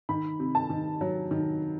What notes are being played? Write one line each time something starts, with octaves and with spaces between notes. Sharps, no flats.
D#3 B5
C3
A5
D#3
F#3
D#3